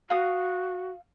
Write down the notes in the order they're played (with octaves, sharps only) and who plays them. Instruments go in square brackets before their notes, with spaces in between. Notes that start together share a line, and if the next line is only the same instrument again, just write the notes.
[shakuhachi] F#4 [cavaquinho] F5 D#6